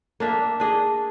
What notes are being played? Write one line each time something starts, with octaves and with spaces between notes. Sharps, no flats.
A#3 D4 E5
D4 G#4 D#5